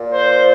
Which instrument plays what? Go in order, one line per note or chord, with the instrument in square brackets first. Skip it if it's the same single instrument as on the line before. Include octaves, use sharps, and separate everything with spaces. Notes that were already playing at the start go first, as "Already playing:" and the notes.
Already playing: [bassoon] A#2
[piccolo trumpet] C5